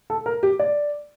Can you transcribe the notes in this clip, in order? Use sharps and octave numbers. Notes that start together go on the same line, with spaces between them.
A4
A#4
G4
D5